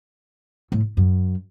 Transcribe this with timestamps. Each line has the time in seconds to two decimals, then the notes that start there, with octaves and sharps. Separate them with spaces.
0.72 A2
0.97 F#2